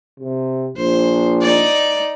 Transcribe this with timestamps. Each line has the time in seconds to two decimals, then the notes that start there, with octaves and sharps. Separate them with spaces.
0.19 C3
0.77 A#1 C5
1.41 D#4 D5